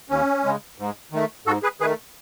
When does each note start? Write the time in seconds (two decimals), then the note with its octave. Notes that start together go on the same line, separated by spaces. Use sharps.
0.10 D#2 C#4
0.44 C#3 G#3
0.78 G#2
1.12 D#3 A3
1.46 G#2 F#4 A4
1.63 G#4 B4
1.80 D#3 G#4 B4
1.84 A3